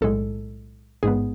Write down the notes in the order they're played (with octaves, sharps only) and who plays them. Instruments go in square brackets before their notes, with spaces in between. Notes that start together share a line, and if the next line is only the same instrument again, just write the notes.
[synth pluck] B1 A2 G#3 A4
A1 G#2 G#3 B3 G#4